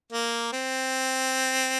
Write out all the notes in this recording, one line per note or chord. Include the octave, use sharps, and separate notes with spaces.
A#3
C4